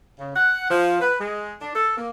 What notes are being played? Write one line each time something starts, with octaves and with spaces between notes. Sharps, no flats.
C#3
F#5
F3
B4
G#3
D4
A4
A#3